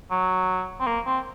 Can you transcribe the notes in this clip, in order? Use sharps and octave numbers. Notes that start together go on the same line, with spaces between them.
F#3
C4
A#3
C4